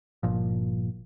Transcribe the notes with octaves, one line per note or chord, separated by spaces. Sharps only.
G1 A#2 F3